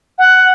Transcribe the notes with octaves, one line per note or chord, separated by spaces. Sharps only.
F#5